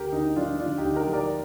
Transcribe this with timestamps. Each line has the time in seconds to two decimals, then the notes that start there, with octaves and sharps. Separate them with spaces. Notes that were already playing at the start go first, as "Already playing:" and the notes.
Already playing: D2 G4 A#4
0.12 D2 D#4
0.36 F3 D4 F4
0.60 D2 D4 F4
0.78 D#4 G4
0.84 D2
0.96 G4 A#4
1.08 F3
1.13 A#4 D5